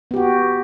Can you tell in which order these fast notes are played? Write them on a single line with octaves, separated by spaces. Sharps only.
B3 G4 F#4